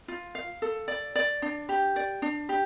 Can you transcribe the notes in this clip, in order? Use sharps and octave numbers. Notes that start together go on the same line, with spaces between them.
F4
F5
A4
D5
D5
D4
G4
D5
D4
G4